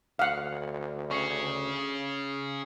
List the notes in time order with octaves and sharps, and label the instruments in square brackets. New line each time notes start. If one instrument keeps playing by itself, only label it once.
[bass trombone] D2 [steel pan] F5 F#5
[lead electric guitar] C#4 G#4 [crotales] C#6 C7 C#7